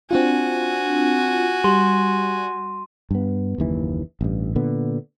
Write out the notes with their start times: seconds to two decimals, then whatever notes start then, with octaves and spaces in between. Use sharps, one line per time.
0.11 C4 D4 F4 F#4 G#5
1.64 G3 C6 D#7
3.11 G2 B3
3.58 F#1 D#2 E3
4.21 A1 G2
4.55 A#2 D3 B3